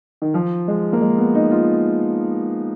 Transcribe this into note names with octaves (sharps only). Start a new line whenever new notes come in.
D#3
F3
G#3
A#3
G#3
B3
D#4
F4